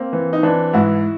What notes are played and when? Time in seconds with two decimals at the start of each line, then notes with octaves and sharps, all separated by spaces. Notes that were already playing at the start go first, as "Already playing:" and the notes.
Already playing: A#3 C4
0.13 E3
0.33 D#4
0.43 E3 C4 D4
0.73 G#2 E4 F#4